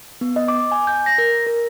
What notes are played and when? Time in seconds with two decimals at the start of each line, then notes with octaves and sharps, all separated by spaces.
0.21 B3
0.36 D#5
0.48 D6
0.72 G#5
0.87 G6
1.06 A#6
1.18 A#4
1.46 A#4